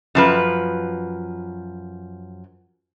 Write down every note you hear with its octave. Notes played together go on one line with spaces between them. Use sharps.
F#2 F3 B4